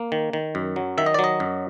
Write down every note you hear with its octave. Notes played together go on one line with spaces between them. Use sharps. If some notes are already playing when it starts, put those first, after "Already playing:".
Already playing: A#3
D#3
D#3
F#2
F#3
D#3 E5
D#5
D5
F#3
D#5
F#2